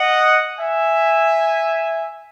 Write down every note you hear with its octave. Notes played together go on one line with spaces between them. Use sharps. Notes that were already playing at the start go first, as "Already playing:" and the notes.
Already playing: D#5 F#5
E5 G#5